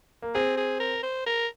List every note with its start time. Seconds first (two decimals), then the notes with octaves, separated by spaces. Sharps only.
0.22 A#3
0.35 C4 G#4
0.57 G#4
0.80 A#4
1.03 C5
1.27 A#4